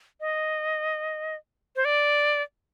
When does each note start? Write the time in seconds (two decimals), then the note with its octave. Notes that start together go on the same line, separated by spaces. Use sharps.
0.20 D#5
1.76 C5
1.85 D5